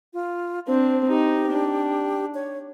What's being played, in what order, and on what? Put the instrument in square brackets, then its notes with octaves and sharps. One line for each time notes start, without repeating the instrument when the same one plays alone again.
[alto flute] F4
[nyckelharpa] C4 D4 [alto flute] C5
[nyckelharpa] D#4 [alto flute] G4
[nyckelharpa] D4
[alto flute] C#5